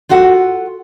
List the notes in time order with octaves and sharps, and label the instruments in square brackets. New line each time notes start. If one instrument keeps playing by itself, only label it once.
[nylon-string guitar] F4 F#4 A4 F#5